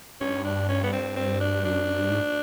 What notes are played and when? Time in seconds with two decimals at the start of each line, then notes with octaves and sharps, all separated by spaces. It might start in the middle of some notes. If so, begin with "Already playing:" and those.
0.21 G2 C#4
0.45 D4
0.69 C#4
0.83 B3
0.93 C4
1.16 C4
1.40 D4
1.64 F#2 D4
1.99 G2
2.10 G#2